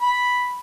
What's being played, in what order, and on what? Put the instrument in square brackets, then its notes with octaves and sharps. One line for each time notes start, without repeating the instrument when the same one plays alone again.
[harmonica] B5